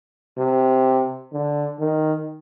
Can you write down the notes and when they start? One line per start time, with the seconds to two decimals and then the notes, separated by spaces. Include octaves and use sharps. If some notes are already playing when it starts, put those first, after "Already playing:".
0.38 C3
1.32 D3
1.79 D#3